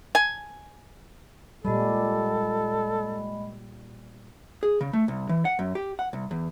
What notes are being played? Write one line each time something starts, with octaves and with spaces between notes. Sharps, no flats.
G#5
A#2 G3 G#3 A4 D#5 B5
G#4
C#3
A3
C2
E3
F#5
F#2
G4
F#5
C2
E2